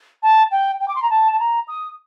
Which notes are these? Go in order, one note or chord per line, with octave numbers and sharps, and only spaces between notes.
A5
G5
G5
D6
C6
A#5
A5
A5
A#5
D#6